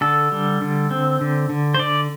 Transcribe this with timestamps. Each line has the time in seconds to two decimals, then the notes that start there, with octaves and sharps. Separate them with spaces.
0.01 D3 A4
0.32 G3
0.62 D3
0.91 C4
1.21 D3
1.50 D3
1.74 C5
1.79 D3 D5